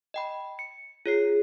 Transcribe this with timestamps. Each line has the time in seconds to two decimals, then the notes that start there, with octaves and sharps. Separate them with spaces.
0.14 D#5 G5 B5
0.59 C#7
1.06 F4 G#4 C#5 C7